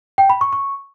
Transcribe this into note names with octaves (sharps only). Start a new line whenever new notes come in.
G5
B5
C#6
C#6